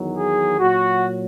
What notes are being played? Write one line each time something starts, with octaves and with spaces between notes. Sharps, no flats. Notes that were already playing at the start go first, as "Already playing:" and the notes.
Already playing: E2 D#3 F#3
G#4
A#2 F#3 F#4